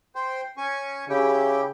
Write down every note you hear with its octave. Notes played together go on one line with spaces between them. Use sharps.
C5 G5 C6
C#4 G#5 C#6
C#3 E4 G4 G5